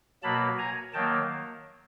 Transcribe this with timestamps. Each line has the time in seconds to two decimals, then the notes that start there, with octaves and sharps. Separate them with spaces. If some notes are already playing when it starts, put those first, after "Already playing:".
0.23 B2 F#3 A#3 A5 B5
0.58 G#5 A#5
0.94 D#3 F#3 A#3 G5 A5